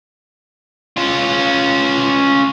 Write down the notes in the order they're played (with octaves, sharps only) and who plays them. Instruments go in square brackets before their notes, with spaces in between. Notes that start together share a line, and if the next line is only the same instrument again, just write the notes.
[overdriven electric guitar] C#4 F4